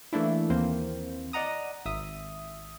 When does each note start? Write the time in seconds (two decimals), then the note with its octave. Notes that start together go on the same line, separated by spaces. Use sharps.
0.13 E3 A3 A#3 D4 E4
0.50 D#2 E3 A#3 C4 C5
1.33 D5 D#5 F#5 A#5 D#6
1.86 G#1 E5 D#6